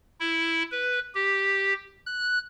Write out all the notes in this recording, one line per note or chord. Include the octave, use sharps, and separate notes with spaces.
E4
B4
G4
F#6